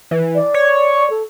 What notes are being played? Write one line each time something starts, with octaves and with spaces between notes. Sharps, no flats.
E3
D5
C#5
A4